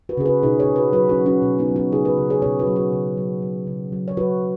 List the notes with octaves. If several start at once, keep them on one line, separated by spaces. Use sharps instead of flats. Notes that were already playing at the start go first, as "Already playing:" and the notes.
F#4 B4
C#3 G#4
F#4 B4
B2 D#4 G#4
G#4 C#5
B2
F#4 B4
F#3 F#4 B4
C#4 F#4
F#3
C#4 F#4
B2 C#4
B3 D#4
F#3
C#4 F#4
C#3 D#4 G#4
F#4 B4
C#3
G#4 C#5
B2 G#4 C#5
F#4 B4
F#3
F#4 B4
C#3
F#3
F#3
C#3
F#3
C#5
F#3 F#4 B4